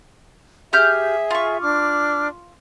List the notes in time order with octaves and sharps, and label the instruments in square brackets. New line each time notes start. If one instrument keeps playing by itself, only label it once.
[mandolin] G4 F6 G6 [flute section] G#4 E5
[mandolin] F4 C#6
[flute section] D4 D6 F6